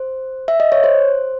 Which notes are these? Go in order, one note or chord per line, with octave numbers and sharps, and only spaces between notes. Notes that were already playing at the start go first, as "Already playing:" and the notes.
Already playing: C5
E5
D#5
C#5
C5